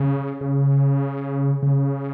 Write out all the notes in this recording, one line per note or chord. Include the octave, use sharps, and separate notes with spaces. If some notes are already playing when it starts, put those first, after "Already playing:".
Already playing: C#3
C#3
C#3